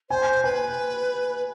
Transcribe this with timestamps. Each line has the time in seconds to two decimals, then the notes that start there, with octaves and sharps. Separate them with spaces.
0.10 C5 G#5
0.44 B4 G#5